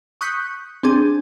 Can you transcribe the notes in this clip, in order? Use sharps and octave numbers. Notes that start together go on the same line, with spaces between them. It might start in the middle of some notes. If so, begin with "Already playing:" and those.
C#6 D#6 F#6 G6 B6 C#7
C4 D4 G#4